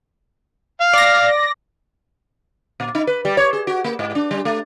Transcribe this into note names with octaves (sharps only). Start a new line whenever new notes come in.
F5
D5 A#6
A#2
D#4
B4
G3
C#5
G#4
F#4
A#3
G#2
D4
G3
A3